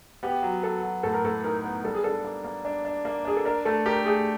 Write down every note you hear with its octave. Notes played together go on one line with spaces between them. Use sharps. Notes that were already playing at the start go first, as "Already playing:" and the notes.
B3 G4
F#3
B3 A4
F#3
A2 A4
A#4
A2 A4
D#4 A#4
B3
G3 A4
G#4
D4 A4
A#3
A#3
D4
D4
A#3
D4 G#4
A4
D4 A#4
A3 A4
G4 A#4
A3 G#4